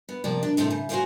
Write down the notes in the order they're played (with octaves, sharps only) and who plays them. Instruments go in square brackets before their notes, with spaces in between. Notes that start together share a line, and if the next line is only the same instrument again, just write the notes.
[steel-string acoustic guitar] B3
C3 F3 A#3 D5
D4
D#2 A2 C3 C4 A4
C#3
F#4 G#4 B4 C5 D5 F5